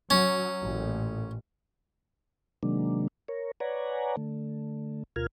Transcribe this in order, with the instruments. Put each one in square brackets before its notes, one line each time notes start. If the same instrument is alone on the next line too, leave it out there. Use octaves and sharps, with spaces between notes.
[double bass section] F#3 [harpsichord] C#4
[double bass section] A1 A#2
[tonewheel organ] C3 D#3 F#3 G#3 A#3 D4
A#4 C#5
B4 C#5 D5 F#5 G#5 A#5
D3 A3
D2 B2 F4 A#4 F6 G#6